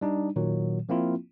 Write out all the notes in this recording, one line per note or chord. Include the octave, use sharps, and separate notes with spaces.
G3 D4 D#4
A#2 D#3 F#3
F3 A#3 C4 E4 F4